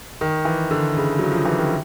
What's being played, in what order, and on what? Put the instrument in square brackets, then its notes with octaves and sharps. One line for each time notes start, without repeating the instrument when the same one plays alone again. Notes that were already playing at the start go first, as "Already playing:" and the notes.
[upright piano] D#3
E3
D3
C#3
F#3
F3
E3
D#3